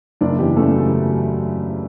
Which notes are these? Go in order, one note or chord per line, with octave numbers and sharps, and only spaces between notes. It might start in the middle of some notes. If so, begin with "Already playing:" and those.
F#1 D4 D5
E2 G4
C#3 A3 A4
F#3